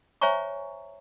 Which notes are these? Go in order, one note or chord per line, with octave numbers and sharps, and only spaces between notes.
C5 C#5 E5 G#5 A#5 C#6